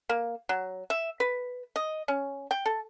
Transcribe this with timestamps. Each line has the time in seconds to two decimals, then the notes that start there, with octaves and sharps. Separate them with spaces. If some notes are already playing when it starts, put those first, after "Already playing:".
0.09 A#3
0.49 F#3
0.90 E5
1.20 B4
1.76 D#5
2.08 C#4
2.51 G5
2.66 A4